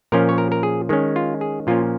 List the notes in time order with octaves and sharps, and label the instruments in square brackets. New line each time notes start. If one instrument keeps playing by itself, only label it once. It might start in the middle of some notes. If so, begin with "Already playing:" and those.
[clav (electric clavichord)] A#2 F3 C#4 A#4
C#5
A#4
A#4
G#4
D#3 G#3 C#4
F4
G#4
A#2 F3 A#3 C#4 F4